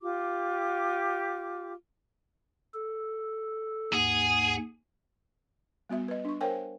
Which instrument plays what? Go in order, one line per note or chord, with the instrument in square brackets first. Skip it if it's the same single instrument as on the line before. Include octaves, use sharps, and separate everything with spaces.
[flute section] F4 G4 D6
[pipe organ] A4
[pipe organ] D#2 G#2 F#5 [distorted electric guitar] G#4
[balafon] G3 B3 F#4 E5
B4 D#5
D4 C#6
A#4 C5 C#5 F5 G5 G#5